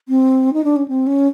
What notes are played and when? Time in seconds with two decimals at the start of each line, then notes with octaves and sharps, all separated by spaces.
0.09 C4
0.53 D#4
0.64 D4
0.76 C#4
0.88 C4
1.07 C#4